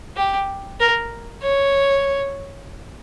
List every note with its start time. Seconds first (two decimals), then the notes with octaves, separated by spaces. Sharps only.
0.17 G4
0.80 A#4
1.42 C#5